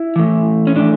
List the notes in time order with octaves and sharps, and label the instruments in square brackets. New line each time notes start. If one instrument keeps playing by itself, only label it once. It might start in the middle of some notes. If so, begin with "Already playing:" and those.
Already playing: [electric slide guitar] E4
A2 E3
C#4
A2 E3 D4